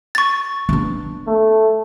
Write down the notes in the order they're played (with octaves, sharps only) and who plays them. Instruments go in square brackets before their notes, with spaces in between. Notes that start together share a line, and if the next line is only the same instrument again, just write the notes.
[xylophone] C#6 A6
[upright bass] B3 D4
[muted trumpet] A3